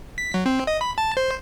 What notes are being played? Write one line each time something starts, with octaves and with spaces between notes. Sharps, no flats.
B6
F#3
C4
D#5
B5
A5
C5